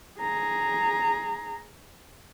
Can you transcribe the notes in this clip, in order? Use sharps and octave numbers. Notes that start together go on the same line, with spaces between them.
G#4 A#5